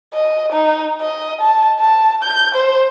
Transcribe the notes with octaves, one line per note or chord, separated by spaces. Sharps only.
D#5
D#4
D#5
A5
A5
G6
C5